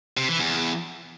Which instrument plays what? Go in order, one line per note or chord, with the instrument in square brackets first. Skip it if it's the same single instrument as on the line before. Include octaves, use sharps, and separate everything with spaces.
[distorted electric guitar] C3
E3
E2